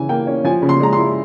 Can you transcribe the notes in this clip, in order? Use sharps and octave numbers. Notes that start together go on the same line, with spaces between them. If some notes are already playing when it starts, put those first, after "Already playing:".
Already playing: C#3 E3 G#5
A#3 G5
C#4
F3 G#5
C#3
C6
G#3 A#5
C6
E4